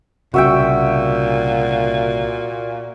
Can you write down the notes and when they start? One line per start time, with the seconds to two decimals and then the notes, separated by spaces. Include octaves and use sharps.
0.34 C2 A#2 C#3 F#4 E5 G5